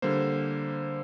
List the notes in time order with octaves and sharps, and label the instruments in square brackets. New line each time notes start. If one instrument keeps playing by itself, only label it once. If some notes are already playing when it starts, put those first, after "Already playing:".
[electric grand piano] D3 G3 A#3 C5